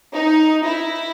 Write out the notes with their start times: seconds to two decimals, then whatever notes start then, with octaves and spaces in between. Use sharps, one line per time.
0.13 D#4
0.63 E4